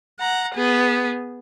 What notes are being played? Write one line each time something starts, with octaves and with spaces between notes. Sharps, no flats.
F#5 A#5
B3 G#4